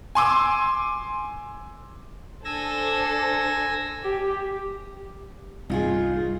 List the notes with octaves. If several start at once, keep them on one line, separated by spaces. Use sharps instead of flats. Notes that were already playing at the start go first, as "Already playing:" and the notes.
G#5 C6 D6 E6
D4 A4 C5 G#5 E6 A#6
G4
C2 G2 C3 D#4 F4 G#4